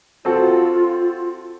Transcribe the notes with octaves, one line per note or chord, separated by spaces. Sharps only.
C4 F4 F#4 A4